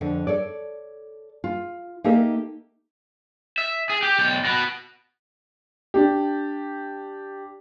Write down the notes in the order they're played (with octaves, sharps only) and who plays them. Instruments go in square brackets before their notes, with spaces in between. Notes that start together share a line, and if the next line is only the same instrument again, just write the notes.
[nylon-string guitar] F2 D3
A4 C#5 D5
F4
A#3 D#4 G4 A4 D#5 E5
[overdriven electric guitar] E5
G#4
G4
B1 G5
F#4 B4
[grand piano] D4 G4